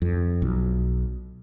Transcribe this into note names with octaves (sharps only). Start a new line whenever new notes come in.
F2
B1